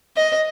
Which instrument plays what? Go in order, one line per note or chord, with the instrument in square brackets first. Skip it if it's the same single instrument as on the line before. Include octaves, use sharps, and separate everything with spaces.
[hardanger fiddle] D#5